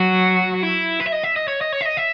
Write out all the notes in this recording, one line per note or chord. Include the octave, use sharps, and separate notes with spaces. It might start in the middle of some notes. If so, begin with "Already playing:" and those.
Already playing: F#3 F#4
E4
B4
E5
D#5
E5
D#5
C#5
D#5
C#5
E5
D#5
E5